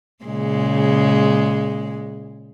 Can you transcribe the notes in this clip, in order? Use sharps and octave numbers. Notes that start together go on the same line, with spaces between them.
A#2 C#3 G#3